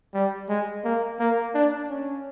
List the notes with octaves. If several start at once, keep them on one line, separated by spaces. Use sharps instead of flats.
G3
G#3
A#3
A#3
D4
C#4